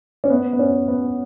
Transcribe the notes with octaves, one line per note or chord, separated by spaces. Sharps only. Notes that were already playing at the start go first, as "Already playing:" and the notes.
C#4
B3
B3
C#4
B3